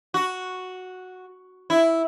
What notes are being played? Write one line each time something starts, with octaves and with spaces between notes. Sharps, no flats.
F#4
E4